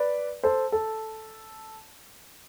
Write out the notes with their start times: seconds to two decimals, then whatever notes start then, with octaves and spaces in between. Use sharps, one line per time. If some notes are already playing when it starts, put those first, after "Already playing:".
Already playing: B4 D5
0.43 A4 C5
0.72 A4